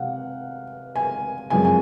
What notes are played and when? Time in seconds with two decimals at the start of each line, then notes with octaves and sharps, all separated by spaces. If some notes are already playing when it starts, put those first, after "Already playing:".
Already playing: C3 F5 F#5
0.96 G#5
1.50 F#2 F3 G#3 C4 G#5
1.65 G#5